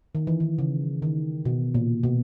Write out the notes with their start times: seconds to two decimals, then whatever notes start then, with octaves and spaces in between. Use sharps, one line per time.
0.15 D#3
0.27 E3
0.40 D#3
0.58 C#3
1.02 D#3
1.45 B2
1.74 A#2
2.03 B2